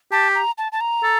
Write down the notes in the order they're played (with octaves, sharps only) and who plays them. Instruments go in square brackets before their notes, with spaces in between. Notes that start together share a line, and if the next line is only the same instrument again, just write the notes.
[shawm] G4 [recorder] A5
[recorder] A#5
A5
A5
A#5
[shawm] A4